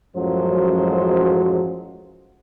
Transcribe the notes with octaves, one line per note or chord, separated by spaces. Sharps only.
A1 F#2 F3 F#3 G#3 C5